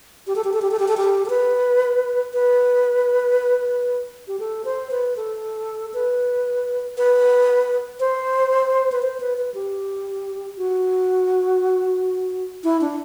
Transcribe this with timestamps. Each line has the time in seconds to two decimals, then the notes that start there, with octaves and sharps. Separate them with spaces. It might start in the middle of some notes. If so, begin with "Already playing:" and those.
0.27 G4
0.36 A4
0.44 G4
0.53 A4
0.62 G4
0.71 A4
0.79 G4
0.88 A4
0.97 G4
1.25 A4
1.30 B4
2.33 B4
4.28 G4
4.39 A4
4.65 C5
4.91 B4
5.17 A4
5.94 B4
6.97 B4
8.00 C5
8.92 B4
9.02 C5
9.20 B4
9.38 B4
9.54 G4
10.58 F#4
12.64 E4
12.81 D4